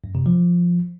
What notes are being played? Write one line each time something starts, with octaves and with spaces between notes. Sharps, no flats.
F#2
C3
F3